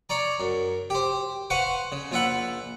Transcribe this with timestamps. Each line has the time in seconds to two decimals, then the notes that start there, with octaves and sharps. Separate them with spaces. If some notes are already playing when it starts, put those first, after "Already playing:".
0.09 C#5 D5 A#5
0.40 F#2
0.90 G4 C5
1.50 B4 C5 F5 F#5 C#6
1.92 C#3
2.12 A#1 F4 E5 F#5 B5